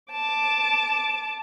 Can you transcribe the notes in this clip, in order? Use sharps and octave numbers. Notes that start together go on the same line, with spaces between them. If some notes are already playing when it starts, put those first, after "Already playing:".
A5 D6